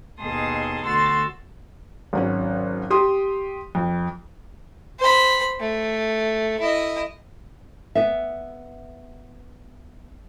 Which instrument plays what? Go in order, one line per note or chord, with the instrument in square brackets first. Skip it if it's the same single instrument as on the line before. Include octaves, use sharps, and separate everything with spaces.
[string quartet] D#2 B2 G#4 A5 C6 D#6
D2 F#4 C6 E6 A6
[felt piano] G#1 F#3 C#4
G4 C6 D#6
F2
[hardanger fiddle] C5 B5
A3
E4 D#5
[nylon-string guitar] B3 E5